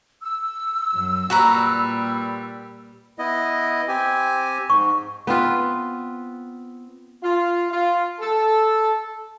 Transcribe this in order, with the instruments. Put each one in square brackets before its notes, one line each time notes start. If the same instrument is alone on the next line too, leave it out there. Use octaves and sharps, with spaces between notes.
[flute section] E6
[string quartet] F#2
[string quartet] A#2 G3 [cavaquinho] F#4 B4 A#5
[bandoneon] B3 E4 D#5
C4 G4 G#5
[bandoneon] G#2 [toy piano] C#6
[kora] B3 C4 F4 B4
[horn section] F4
F4
A4